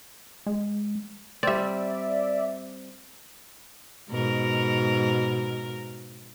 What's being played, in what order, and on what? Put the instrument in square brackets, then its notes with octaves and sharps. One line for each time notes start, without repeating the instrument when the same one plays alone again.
[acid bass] G#3
[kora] G3 C4 [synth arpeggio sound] D5 E5
[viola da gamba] G#2 B2 A#4